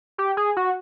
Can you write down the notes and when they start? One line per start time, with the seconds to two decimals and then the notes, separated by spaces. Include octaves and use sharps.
0.18 G4
0.37 G#4
0.57 F#4